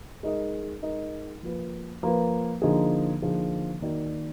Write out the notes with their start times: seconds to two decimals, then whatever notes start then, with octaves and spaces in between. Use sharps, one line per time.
0.23 G#3 D#4 A#4 D#5
0.82 G#3 D#4 A#4 D#5
1.43 F3 A#3 F4 B4
2.03 F3 A#3 F4 B4
2.62 D3 F3 A#3 D#4 G#4
3.22 D3 F3 A#3 D#4 G#4
3.81 D#3 A#3 D#4 F#4 D5